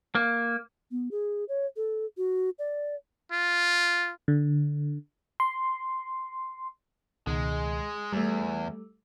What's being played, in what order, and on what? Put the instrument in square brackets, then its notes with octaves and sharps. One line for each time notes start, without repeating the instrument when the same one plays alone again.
[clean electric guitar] A#3
[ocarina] B3
G#4
C#5
A4
F#4
D5
[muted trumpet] F4
[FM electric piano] D3
C6
[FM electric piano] C#2 B2 D#3 [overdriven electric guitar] G#3
[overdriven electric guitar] E2 [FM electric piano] G3 A3